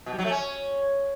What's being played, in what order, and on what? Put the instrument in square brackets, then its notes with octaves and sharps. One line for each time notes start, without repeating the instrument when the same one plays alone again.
[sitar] B2
G3
F#3
A3
C#4